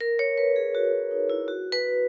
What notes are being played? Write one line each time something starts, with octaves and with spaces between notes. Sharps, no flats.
A#4
C#5
B4
G#4
F#4
F#4
D#4
E4
F#4
B4